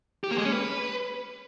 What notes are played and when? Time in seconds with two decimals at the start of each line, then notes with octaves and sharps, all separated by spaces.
0.24 G4
0.31 A#3
0.38 G#3
0.45 C#4
0.52 B4